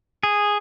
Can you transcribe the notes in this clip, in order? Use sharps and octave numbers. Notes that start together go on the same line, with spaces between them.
G#4